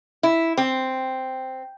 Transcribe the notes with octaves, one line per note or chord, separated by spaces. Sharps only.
E4
C4